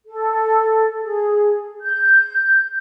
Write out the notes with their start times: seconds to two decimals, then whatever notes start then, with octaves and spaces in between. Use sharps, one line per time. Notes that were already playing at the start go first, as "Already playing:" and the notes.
0.07 A4
1.00 G#4
1.81 G6